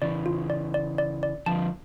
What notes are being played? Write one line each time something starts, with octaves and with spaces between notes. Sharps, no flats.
C#3 E3 D5
F4
D5
D5
D5
D5
D3 F3 A5